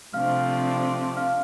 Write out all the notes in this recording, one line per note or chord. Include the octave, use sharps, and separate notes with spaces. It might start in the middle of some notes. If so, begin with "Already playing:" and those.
C3 F3 A3 D4 F5 F6
F5 F6